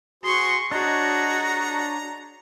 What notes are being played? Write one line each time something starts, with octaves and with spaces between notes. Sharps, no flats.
F#4 G#4 C5 C6 C#6
D4 F#4 G#4 C#5 D#5 A#5